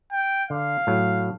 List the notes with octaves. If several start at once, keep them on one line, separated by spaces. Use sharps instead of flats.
G5
D3 F5
A2 F#3